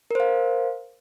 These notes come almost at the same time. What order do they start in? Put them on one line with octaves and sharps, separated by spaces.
A#4 C5 F5